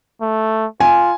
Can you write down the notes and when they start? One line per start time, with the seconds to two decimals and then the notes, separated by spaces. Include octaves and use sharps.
0.21 A3
0.80 F4 G#5